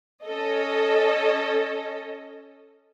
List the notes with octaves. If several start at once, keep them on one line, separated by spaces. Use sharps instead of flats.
C#4 A4 D#5